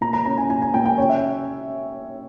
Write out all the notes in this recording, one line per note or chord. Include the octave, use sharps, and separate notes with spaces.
A#2 A#5
A#5
C#4 A#5
G#5
A#2 G#5
G#5
A#2 G5
G5
C#4 C#5
E5